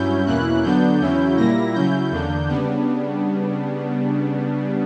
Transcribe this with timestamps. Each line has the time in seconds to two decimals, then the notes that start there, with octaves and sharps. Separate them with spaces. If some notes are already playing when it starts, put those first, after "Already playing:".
Already playing: G2 F#3 C#4 E4 G6
0.26 E2 B2 A#3 C#4 E4 F#6
0.63 D3 F#3 B3 D4 G6
1.00 E2 C#3 F#3 C#4 E4
1.37 A#2 G3 A#3 E4 A#6
1.74 C#3 F#3 C#4 E4 G6
2.11 E2 D3 A#3 D4
2.48 C#3 G3 B3 D4